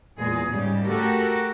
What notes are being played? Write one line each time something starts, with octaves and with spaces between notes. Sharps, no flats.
E2 A#2 G#3 G#4
G#2 C#3 G3
A3 F#4 G4 A4 A#4